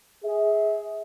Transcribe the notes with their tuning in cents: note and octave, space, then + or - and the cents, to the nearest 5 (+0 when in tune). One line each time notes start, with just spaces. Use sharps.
G#4 +0 E5 -30